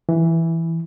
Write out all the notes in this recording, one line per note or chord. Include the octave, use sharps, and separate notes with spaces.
E3